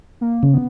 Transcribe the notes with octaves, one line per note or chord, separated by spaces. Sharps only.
A#3
C#3
B3